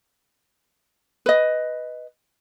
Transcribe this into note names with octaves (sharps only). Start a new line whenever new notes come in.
B4 D#5